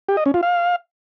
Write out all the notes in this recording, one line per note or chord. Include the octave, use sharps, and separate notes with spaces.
G4
D#5
C#4
F4
F5